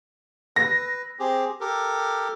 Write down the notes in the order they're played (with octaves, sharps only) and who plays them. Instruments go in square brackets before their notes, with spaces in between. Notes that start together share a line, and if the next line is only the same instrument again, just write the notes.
[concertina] B4 [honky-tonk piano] A#6
[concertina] C4 G4 G#4
G4 A4 A#4